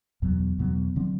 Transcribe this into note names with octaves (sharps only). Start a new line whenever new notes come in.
E2 B2 F#3 B3
E2 B2 F#3 B3
D3 F#3 C4